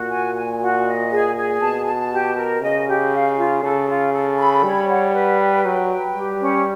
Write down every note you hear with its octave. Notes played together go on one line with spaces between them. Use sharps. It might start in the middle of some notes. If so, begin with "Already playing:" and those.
Already playing: A#2 F#4
G#5
G#5
F#4
D#5
G#4
G#4
B2 A5
A5
G4
A#4
C#3 D#5
G4
F5
F4
C#3 A4
F4
A4
B5
G3 C#5
F#5
B4
G5
F#3 G5
B4
G3 G4
C#4